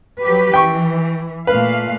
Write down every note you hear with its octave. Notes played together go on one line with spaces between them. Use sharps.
F#3 G4 B4
E3 G5 C#6
A#2 A3 B4 F5